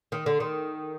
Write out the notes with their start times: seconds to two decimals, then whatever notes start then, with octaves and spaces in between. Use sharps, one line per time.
0.12 D#3
0.26 D3
0.40 D#3